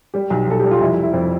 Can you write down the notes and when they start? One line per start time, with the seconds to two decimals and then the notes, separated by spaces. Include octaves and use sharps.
0.14 G3 G4
0.30 B1
0.47 B1 A4
0.60 G4
0.65 G3
0.71 F4
0.81 F1 E4
0.97 F1
1.03 E4
1.14 F2